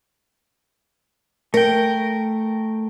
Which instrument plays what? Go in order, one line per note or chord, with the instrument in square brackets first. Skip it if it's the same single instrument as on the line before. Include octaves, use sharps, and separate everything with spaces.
[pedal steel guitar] A3 G5 [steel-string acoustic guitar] A#4